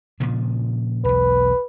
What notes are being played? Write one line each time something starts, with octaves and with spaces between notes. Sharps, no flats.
A#2 C#3 F3
B1 E2 B4